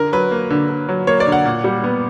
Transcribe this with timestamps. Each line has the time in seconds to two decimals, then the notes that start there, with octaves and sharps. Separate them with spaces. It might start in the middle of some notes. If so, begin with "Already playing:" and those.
Already playing: D3 A#4
0.13 F#3 B4
0.31 A#3
0.50 D3
0.70 D3
0.89 F#3
1.07 A#3 C#5
1.20 D5
1.27 D3
1.32 F#5
1.46 A#2
1.64 G3
1.84 B3